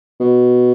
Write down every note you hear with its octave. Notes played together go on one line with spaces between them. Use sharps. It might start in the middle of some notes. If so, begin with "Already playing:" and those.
B2